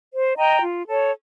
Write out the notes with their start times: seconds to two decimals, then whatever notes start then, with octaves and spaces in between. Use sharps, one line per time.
0.13 C5
0.37 D#5 G5 A#5
0.62 F4
0.87 A4 C#5